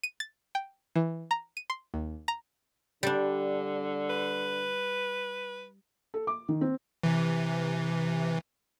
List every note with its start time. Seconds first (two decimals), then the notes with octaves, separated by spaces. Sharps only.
0.03 D#7
0.20 A6
0.55 G5
0.96 E3
1.31 A#5
1.57 D#7
1.70 C6
1.94 D#2
2.28 A#5
3.03 D3 G3 D4
4.10 B4
6.14 A4
6.27 D6
6.49 D#3
6.61 C4
7.03 C3 E3